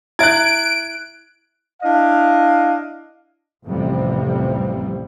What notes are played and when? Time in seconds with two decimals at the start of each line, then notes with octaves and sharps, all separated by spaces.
0.19 E4 E5 F#6 G#6 D7
1.83 D4 E4 D#5 F5
3.67 A1 F2 C3 G3